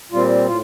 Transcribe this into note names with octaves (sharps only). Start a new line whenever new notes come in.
A#2 G3 C4 F4
A2 F4